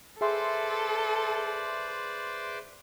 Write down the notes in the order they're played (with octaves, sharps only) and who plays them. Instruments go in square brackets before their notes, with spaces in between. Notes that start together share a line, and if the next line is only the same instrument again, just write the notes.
[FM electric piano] G#4 E5 C6 [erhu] A4 [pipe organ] B4 C5 D5